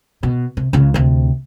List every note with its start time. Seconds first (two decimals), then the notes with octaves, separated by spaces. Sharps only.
0.23 B2
0.57 C3
0.73 C#2 C#3
0.94 D2 C3